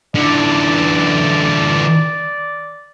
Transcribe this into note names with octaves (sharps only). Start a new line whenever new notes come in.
D3 E3 D5